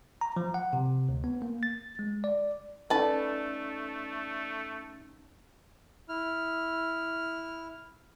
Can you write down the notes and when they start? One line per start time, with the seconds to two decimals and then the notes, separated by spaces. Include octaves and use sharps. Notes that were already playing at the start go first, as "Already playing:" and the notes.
0.21 A#5
0.36 F3
0.54 F#5
0.73 C3
1.09 D2
1.24 B3
1.42 A#3
1.63 A6
1.99 G#3
2.24 D5
2.90 A3 C#4 D#4 A4 B4 D5 A5
6.09 E4 F6